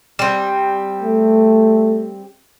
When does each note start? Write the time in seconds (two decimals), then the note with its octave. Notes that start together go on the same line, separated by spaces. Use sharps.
0.19 G3 C4
1.03 A3